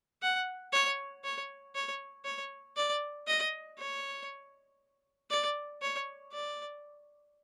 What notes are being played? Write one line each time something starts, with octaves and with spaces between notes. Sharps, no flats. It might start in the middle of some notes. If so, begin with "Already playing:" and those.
F#5
C#5
C#5
C#5
C#5
D5
D#5
C#5
D5
C#5
D5